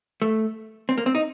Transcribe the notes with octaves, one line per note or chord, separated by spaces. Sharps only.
A3
C4
A#3
C4
D#4